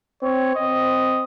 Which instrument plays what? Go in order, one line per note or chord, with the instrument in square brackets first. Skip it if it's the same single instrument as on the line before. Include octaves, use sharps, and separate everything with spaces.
[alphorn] C4 [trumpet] C#5
[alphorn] C4 [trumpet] D#5